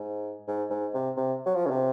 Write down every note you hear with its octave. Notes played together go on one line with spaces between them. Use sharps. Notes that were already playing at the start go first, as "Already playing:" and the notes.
Already playing: G#2
G#2
G#2
C3
C3
F#3
F3
C#3
C3